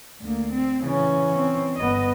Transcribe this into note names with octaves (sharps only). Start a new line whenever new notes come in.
D2 A#3
C4
C#3 E3 C#4
C4
G1 B3 D#5